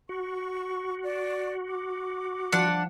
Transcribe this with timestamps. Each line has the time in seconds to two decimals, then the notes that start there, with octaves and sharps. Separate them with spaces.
0.09 F#4 C#6
1.03 D5
1.68 D6
2.52 F3 D4 F#5